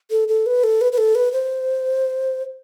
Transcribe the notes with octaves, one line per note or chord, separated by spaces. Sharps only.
A4
A4
B4
A4
B4
B4
A4
B4
C5